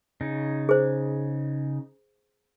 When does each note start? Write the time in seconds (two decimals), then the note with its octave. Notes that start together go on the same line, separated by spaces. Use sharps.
0.21 C#3 D#4
0.69 G#4 C5